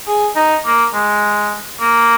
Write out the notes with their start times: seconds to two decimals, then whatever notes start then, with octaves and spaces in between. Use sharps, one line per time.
0.07 G#4
0.36 D#4
0.66 A#3
0.94 G#3
1.80 A#3